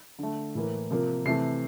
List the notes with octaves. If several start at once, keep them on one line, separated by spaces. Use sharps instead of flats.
D3 A3
A2 E3 A#3
C3 F3 A#3
C3 E3 A3 C7